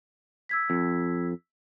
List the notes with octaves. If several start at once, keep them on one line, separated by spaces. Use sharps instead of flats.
E6 G#6 B6
F2